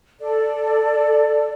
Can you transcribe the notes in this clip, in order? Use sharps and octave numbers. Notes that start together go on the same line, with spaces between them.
A4 D5